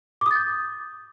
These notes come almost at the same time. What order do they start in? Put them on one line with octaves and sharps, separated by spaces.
D6 D#6 A6 G6